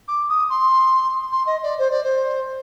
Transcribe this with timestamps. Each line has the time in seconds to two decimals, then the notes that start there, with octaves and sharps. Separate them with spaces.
0.08 D6
0.29 D#6
0.50 C6
1.32 C6
1.47 D#5
1.63 D5
1.79 C5
1.91 D5
2.03 C5